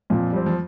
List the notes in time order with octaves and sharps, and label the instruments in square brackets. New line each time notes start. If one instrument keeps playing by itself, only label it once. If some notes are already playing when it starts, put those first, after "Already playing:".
[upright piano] F2 F3 [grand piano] A#2
[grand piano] G3 C4
[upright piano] F3